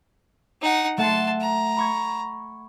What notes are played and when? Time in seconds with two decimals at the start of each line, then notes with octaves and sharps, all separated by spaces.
0.62 D#4 F#5
0.98 A3 F#5 A5 C6 F#6
1.41 A#5
1.77 B5 C#6 G#6